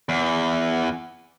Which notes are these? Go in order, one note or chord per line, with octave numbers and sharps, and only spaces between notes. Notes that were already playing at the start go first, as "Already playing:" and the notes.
E2